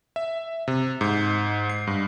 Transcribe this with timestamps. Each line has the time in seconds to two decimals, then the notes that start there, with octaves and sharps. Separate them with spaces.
0.16 E5
0.68 C3
1.01 G#2
1.70 C7
1.87 G2